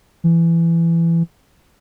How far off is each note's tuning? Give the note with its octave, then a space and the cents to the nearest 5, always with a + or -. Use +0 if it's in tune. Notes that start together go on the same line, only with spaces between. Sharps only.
E3 +20